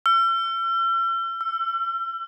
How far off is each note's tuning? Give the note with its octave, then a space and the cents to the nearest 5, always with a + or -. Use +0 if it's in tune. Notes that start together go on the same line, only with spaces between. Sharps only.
E6 +45
E6 +25